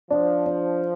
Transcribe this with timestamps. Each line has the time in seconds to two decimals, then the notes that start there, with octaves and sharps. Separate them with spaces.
0.10 F3 D4
0.46 D4